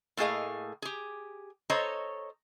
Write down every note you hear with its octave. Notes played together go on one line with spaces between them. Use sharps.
A2 A3 A#3 G#4 D#5 F5
G4 G#4
A4 C5 C#5 D#5 A#5